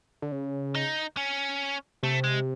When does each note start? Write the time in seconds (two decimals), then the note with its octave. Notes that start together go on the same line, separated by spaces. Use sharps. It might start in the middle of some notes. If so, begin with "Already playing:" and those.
0.22 D3
0.32 C#3
0.75 D#4
1.17 C#4
2.03 C3 A3
2.24 G#3